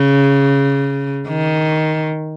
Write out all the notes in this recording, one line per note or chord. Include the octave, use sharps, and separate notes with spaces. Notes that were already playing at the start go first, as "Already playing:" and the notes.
Already playing: C#3
D#3